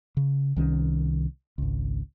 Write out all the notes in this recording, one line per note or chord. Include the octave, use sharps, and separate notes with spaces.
C#3
C2 D#3 C#4
G#1 C#2